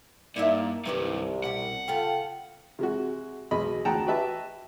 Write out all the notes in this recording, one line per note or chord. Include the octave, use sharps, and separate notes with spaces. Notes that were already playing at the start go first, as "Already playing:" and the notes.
G2 A#3 D#4 E4 C#5 D5 E5
C2 G2 D#3 F#3 B4 D5
B2 G4 F#5
C#3 F4 A4 G5
C3 G#3 F#4
B1 B2 G#3 D#5 B5
D2 G#4 F#5 G5 A5 A#5
F#4 G4 B4 D#5 E5 A5